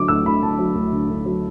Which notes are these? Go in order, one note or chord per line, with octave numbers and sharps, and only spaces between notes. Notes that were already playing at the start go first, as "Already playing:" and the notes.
Already playing: D3 F#3 D6
D2 E6
D2 B5
D3 A5
F#3
D2
D2
D3
F#3